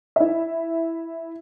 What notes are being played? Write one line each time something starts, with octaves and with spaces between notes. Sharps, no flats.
E4 E5